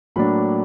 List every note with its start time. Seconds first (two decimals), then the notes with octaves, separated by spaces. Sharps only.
0.16 A2 F#3 A#3 D4 B5